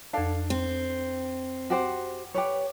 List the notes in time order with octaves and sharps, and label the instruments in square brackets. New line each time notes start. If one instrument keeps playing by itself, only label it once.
[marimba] F2 A5 [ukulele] D4 A4 F5
[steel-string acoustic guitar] C4
[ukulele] F#4 G4 C5
G4 B4 C#5